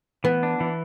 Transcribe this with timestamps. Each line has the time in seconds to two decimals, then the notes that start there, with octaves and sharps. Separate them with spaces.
0.24 E3 B3
0.43 D4
0.60 E3